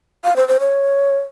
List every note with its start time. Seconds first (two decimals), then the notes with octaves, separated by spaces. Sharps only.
0.24 F5
0.36 C5
0.48 C5
0.60 C#5